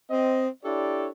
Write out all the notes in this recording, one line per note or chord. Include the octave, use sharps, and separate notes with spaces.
C4 D#5
D4 E4 G4 A4 C#5 D5